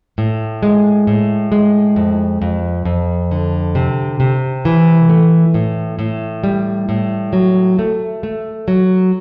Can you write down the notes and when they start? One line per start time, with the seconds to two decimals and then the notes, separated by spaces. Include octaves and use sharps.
0.18 A2
0.63 G#3
1.07 A2
1.52 G#3
1.96 F2
2.42 F2
2.85 F2
3.31 D3
3.75 C3
4.20 C3
4.65 E3
5.09 A3
5.54 A2
5.99 A2
6.44 G3
6.89 A2
7.33 F#3
7.79 A3
8.23 A3
8.68 F#3